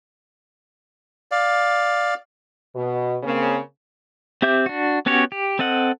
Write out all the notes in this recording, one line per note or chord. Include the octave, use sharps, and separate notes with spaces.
D5 F5
B2
C#3 A#3 C4
C4 G4 E5 D6 G6
D4 F#4
B3 C#4 F#4 G4 C#5
G4
C4 A4 D#5 F#5